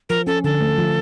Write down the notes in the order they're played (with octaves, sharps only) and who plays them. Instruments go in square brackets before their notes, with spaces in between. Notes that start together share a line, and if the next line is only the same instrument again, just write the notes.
[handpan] F3 [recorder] A#4
[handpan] C#4 [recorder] A4
[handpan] D3 [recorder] A4
[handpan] A3
F3